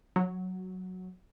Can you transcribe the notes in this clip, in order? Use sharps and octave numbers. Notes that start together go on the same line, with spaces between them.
F#3